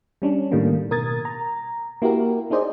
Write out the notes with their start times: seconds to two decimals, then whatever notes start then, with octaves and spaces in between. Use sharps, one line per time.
0.22 G3 C#4 D4
0.52 A2 D#3 G3 A3 A#3
0.91 B2 A#4 D#6 G#6 A6
1.25 A#5
2.02 A#3 E4 F#4 G4 A#4
2.50 D4 D#4 G#4 C5 D5 D#5